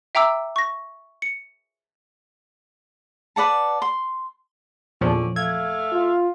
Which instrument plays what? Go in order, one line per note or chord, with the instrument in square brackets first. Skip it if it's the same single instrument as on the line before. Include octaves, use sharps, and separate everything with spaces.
[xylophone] E5 G5 A#5 D6 E6
C#6 A#6
C#7
[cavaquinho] B4 D5 F#5 A5
C6
[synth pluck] E2 A#2 F3 [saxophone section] D3 C#4 D5
[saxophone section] A3 E5 F5 [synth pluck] G#6
[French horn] F4